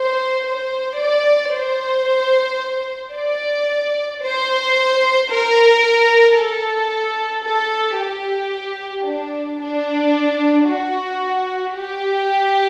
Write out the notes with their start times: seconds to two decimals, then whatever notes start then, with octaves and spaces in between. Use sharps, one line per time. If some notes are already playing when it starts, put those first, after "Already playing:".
Already playing: C5
0.45 C5
0.99 D5
1.53 C5
3.14 D5
4.23 C5
5.30 A#4
6.37 A4
7.44 A4
7.98 G4
9.06 D4
9.60 D4
10.68 F#4
11.75 G4